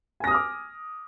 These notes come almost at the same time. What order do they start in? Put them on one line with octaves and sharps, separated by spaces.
G#5 A#6 D#6 F6 D6